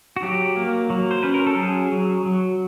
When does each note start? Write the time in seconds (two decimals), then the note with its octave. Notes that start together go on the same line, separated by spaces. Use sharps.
0.16 F#4
0.23 F#3 G4
0.56 A#3
0.90 F#3
1.11 C5
1.23 C#4 B4
1.34 A#4
1.47 A4
1.58 F#3 G#4
1.92 F#3
2.26 F#3